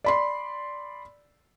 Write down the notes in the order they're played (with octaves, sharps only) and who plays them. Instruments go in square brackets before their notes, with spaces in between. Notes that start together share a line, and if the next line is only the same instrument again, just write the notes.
[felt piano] D5 B5 C6